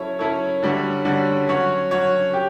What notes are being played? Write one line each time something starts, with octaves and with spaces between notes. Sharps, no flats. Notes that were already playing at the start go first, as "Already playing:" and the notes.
Already playing: F#3 C#4 E4 A4 C#5
F#3 C#4 E4 A4 C#5
D3 G3 C#4 F#4
D3 G3 C#4 F#4
F#3 C#4 F#4 C#5
F#3 C#4 F#4 C#5
G4